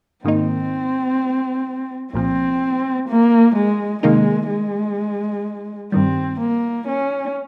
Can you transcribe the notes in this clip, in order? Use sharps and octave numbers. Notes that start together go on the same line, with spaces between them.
G#2 D#3 A#3 C4 D#4
C2 A#2 F3 C4
A#3
G#3
C3 D#3 G#3 A#3 D#4
G#3
G2 D#3 G3 C4
A#3
C#4